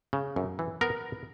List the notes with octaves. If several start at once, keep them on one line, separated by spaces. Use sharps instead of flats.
C#3
F#2
E3
B3 A#4